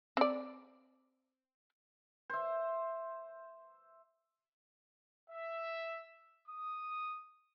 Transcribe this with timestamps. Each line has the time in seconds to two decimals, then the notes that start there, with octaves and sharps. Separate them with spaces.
0.17 C4 D5
2.30 C5 E5
5.29 E5
6.47 D#6